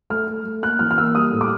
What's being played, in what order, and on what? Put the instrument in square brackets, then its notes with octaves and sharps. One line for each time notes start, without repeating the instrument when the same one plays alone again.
[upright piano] A3 F6
A3
A3
A#3 F#6
E3 F6
F6
A#3 E6
G3 D#6
A2
D6